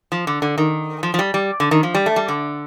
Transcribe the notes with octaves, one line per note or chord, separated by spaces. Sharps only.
F3
D3
D3
D#3
F3
F3
G3
G3
D3
D#3
F3
G3
A3
G3
D3